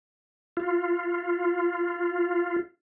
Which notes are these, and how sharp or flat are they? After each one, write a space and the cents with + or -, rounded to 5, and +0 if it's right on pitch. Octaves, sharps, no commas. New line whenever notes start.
F4 -5